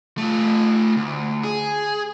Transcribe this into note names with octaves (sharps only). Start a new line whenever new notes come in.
A3 F4
D2
G#4